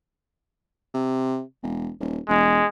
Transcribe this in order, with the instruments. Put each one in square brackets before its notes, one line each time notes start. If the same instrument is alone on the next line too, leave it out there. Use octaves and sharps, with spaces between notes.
[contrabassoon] C3
E1
D#1
[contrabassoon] E1 [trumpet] G#3